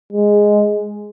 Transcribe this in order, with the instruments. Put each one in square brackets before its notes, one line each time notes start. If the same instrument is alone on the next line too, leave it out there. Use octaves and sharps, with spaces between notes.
[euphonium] G#3